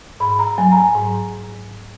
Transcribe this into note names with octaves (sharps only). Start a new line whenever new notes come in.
G#2 B5
A#5
F#3 G#5
A#5
G#5
G#2